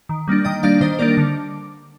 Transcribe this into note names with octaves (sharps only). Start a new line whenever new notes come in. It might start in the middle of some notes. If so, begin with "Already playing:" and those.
D#3
G3 A#3 D4
D#3 D#5 G5
G3 A#3 D4 D5 F5
D#3 C5 D#5
G3 A#3 D4 A#4 D5
D3